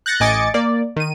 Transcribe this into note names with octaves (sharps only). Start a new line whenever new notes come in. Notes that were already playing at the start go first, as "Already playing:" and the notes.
F#6 G6 A6 A#6 C#7
A1 D#5 G#5 D6 A6 C#7
A#3 D5
D#3 D#7